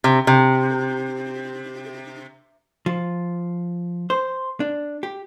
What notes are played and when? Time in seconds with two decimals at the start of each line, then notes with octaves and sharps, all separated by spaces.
0.04 C3
0.27 C3
2.86 F3
4.10 C5
4.60 D4
5.03 G4